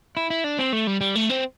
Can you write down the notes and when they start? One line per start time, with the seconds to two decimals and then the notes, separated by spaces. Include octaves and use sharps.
0.17 E4
0.30 E4
0.44 D4
0.59 C4
0.73 A3
0.87 G3
1.01 G3
1.15 A3
1.29 C4